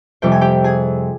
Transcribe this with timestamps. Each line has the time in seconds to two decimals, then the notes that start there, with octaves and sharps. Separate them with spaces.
0.22 F2 C3 G3 G5
0.32 G#5
0.41 G4 G5
0.64 G#4 G#5